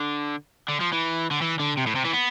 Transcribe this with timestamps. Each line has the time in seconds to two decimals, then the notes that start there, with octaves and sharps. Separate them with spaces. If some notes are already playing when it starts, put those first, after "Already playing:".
Already playing: D3
0.68 D3
0.80 F3
0.92 E3
1.31 D3
1.42 E3
1.60 D3
1.77 C3
1.87 A2
1.95 C3
2.05 E3
2.14 B3